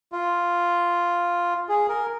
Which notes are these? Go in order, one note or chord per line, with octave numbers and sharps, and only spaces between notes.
F4
G#4
A#4